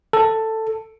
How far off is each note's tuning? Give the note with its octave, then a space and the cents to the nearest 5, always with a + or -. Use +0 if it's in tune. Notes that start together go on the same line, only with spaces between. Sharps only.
A4 +10